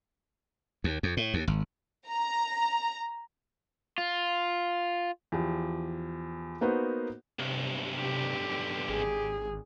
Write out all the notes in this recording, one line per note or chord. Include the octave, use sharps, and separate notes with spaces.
D#2
F2
A2
D#2
G#1
A#5
F4
E2 F3 G4
A#3 B3 D#4 F#4 B4 C5
B1 G2 C3
D3 G4
G#1 G#4